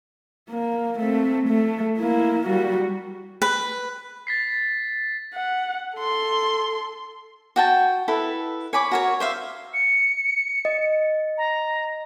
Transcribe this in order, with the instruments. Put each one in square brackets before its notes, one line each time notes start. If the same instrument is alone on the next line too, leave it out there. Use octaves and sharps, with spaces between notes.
[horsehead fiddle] A#3
A3 C4
A3
A#3 E4
G3 F#4
[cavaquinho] B4
[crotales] A6 B6 C7
[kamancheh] F#5
A4 C6
[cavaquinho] F#4 G5 A5
E4 A4 B4
C#5 G#5 B5 D6
F#4 A#4 C#5
C5 E5 F5
[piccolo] C#7
[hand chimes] D#5
[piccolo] A#5